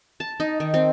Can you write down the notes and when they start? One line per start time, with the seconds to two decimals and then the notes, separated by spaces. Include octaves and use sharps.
0.20 A5
0.40 D#4
0.60 D#3
0.74 C4